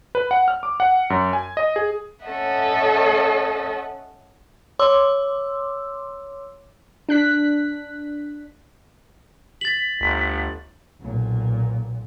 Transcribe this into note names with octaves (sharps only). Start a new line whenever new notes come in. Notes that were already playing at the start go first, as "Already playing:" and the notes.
B4
F#5
F6
D6
F#5
F#2
G#5
D#5
G#4
C#4 A4 C#5 D#5 E5 F#5
C#5 C6 D6 E6
D4 F#6 B6
A6 B6 F#7
G1 D2
B1 A#2